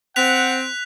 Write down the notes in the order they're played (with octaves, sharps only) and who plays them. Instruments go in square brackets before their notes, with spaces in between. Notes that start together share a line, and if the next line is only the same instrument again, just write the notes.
[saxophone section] C4 [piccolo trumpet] F#5 [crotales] F#6 B6 F7